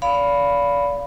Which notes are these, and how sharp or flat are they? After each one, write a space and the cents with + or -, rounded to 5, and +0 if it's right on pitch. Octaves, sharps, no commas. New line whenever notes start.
D5 -35 F5 +0 B5 +0